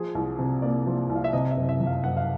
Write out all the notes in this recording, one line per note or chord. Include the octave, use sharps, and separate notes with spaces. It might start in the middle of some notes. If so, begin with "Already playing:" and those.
Already playing: F3 G#4
C2
C3
A#3 D5
F3
C2
F5
E5
C3 D#5
E5
F#1
E5
F2
F5
F#1 F#5
F5